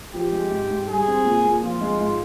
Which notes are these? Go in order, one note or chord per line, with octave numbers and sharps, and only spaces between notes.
F3 G4
G#3
G#2
G#2
G3 G#4
C4
A#2
A#2
F3 F4
G#3
G#2